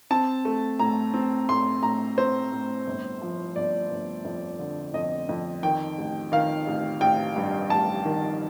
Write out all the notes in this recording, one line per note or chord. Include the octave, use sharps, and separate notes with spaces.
C4 A5
A3
A2 A#5
C4
A2 C6
A2 A#5
C4 C5
A2
G1
F3
G1 D5
G1
F2
D3
F2 D#5
F2
D#3 G5
A1
D#3 F5
A1
A1 G5
G2
A1 A5
D#3